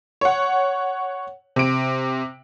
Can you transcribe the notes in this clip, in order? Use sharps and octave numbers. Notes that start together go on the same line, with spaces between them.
C#5 F#5
C3 D7